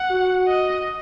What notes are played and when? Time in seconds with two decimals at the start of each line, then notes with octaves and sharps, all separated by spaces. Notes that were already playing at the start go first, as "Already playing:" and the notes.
Already playing: F#5
0.10 F#4
0.48 D#5